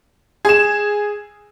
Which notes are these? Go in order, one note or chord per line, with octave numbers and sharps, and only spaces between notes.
G#4 E7